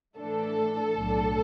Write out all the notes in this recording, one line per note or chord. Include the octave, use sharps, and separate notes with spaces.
A2 E3 A3 D4 A4
B1 A2 F#3 D4